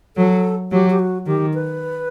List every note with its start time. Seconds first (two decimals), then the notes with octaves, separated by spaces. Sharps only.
0.17 F#3 A4
0.72 F#3 G4
0.90 G4
0.99 F#4
1.27 D#3 G4
1.54 B4